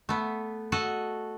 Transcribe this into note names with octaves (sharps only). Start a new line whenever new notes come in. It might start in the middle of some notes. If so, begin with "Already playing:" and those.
A3 B3
F#4 A4 D#5